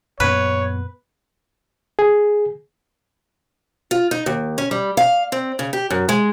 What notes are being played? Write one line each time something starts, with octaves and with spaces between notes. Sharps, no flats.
F#2 A#2 B3 B4 C#5
G#4
F4
D#4
D#2
C#4
G3
F5
C4
C#3
G4
F#2
G#3